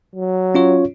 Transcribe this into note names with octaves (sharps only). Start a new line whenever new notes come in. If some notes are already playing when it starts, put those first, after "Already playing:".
F#3
C#4 F4 C#5